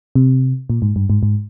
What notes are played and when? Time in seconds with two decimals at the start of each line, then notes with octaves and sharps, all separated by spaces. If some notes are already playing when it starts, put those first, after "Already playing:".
0.15 C3
0.70 A#2
0.82 G#2
0.96 G2
1.10 G#2
1.23 G#2